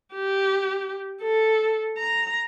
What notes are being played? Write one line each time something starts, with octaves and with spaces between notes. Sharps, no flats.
G4
A4
A#5